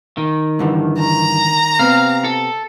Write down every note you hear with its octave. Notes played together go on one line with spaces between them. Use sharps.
D#3
G2 D3 E3
A#5
C3 B3 C4 F5
A4